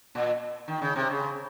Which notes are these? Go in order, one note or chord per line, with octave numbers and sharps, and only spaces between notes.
A#2
D#3
C#3
C3
C#3